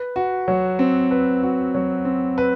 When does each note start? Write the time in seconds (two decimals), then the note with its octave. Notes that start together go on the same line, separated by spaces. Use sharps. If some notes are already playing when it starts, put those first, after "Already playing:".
Already playing: B4
0.16 F#4
0.48 F#3
0.79 C4
1.11 B4
1.43 F#4
1.75 F#3
2.05 C4
2.38 B4